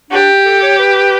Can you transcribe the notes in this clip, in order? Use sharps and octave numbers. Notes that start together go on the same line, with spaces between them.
D4 G4
A4
C#5
B4